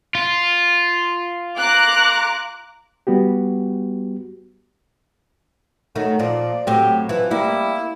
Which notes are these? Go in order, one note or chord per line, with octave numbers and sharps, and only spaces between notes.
F4
A#5 D6 F#6
G3 B3 F#4 G4
D#3 F#3 A3
A#2 F3 D5
A2 F#3 C4 G4
E3 F3
G3 A#3 E4